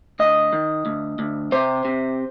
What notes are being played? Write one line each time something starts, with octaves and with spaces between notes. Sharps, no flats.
D2 D#5
D#3
D2
D2
C3 C5
C3